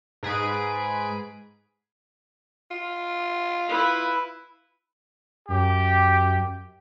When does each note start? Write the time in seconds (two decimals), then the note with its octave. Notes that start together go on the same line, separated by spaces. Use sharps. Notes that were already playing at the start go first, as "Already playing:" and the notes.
0.23 G#2 G#4 B4 D7
2.71 F4
3.69 E4 B4
5.49 F#2 G4